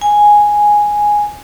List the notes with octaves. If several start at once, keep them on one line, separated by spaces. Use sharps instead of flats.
G#5